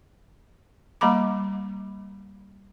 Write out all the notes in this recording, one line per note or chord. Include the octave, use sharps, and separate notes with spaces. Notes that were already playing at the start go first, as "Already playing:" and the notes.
G3 A#3 A#5 B5 D6